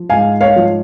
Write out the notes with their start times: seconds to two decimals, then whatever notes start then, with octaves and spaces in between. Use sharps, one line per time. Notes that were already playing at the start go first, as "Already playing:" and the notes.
Already playing: F3
0.10 G#2 F5 G#5
0.41 C#5 F5
0.56 F3